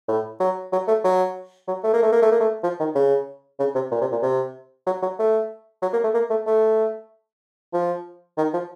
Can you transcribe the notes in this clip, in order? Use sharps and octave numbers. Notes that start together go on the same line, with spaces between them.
A2
F#3
F#3
A3
F#3
F#3
A3
A#3
A3
A#3
A3
A#3
A3
F3
D#3
C#3
C#3
C3
A#2
C3
A#2
C3
F#3
F#3
A3
F#3
A#3
A3
A#3
A3
A3
F3
D#3
F3